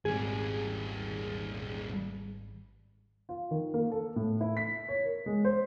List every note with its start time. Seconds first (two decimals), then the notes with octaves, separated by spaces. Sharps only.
0.05 G#1 D#2 G3 G#4
3.29 F4
3.51 D#3
3.74 A#3
3.92 A4
4.16 A2
4.41 E4
4.57 B6
4.89 C#5
5.05 A#4
5.26 G#3
5.45 C5